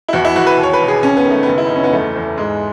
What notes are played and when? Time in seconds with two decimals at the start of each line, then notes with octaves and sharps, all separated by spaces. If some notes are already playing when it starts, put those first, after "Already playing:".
0.08 E4
0.13 E2 F#4
0.25 E4
0.36 E2 F#4
0.46 B4
0.57 D#2
0.63 C#5
0.73 B4
0.81 E1
0.88 G#4
1.02 D#2 C#4
1.17 B3
1.25 D#3
1.30 A3
1.43 F#1 B3
1.58 E4
1.66 D#4
1.70 F#1
1.75 C#4
1.84 B3
1.92 E2 A3
2.16 E2
2.37 G#2 G#3